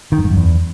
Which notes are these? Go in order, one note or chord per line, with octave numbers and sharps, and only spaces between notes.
D#3
F#2
G#2
F#2
E2